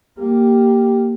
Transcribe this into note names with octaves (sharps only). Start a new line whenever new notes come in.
A#3 G4